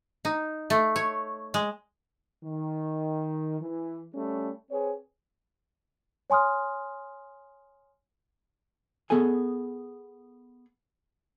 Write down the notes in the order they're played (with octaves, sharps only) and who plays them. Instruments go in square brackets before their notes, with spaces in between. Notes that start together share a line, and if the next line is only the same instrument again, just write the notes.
[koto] D#4
A3
C#5
G#3
[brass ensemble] D#3
E3
G3 A3 C#4
C4 G#4 B4 C#5
[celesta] C#5 G#5 C6 D#6 F6
[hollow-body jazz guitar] B3 G#4 A4 G#5